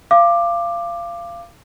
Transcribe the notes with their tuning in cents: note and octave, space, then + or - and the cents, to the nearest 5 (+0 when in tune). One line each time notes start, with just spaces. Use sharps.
F5 -25 D6 +10